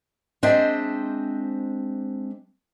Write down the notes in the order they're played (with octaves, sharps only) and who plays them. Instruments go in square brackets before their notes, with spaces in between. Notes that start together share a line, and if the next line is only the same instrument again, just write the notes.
[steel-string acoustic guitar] G#3 C4 D4 C5 D#5 E5